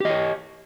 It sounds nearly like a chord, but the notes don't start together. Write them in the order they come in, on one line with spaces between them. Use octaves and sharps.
G4 D#5 C#5